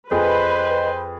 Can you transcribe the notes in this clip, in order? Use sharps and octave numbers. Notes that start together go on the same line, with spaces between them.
F2 G#4 B4 C5 D#5